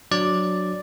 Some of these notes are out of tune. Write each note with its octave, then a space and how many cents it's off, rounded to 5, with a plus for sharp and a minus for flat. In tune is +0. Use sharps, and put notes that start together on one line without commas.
F#3 -5 D4 +5 D5 +0